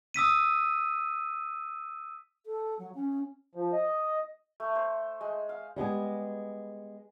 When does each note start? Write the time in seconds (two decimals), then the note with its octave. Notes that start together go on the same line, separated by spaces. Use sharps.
0.14 D#6 E6 B6 D#7
2.46 A4
2.79 F#3
2.95 C#4
3.55 F3
3.73 D#5
4.60 A3
4.75 C5
5.21 G#3
5.49 F5
5.76 G3 G#3 B3 G#4